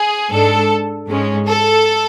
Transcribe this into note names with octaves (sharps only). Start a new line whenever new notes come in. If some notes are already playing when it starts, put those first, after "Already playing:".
Already playing: G#4
G#2 G#3 D4 A4
G#2 G#3 C#4
A4